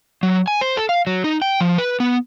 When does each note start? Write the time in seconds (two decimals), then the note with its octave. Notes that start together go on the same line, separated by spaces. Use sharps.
0.23 F#3
0.48 G#5
0.61 C5
0.77 A4
0.89 F5
1.07 F#3
1.24 D#4
1.42 G5
1.61 F3
1.78 B4
2.00 B3